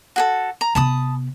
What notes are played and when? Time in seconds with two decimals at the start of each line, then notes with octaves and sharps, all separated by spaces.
0.16 F#4 G#4 A4
0.61 A#5
0.75 C3 B3 A5 B5 D#6